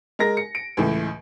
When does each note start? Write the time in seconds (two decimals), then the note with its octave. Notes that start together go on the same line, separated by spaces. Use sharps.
0.19 G#3 A#4 A#6
0.37 C#7
0.55 D7
0.77 C#2 A2 E3